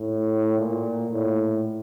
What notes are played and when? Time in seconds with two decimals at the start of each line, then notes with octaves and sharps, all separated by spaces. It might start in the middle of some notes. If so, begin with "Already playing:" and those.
Already playing: A2
0.58 A#2
1.10 A2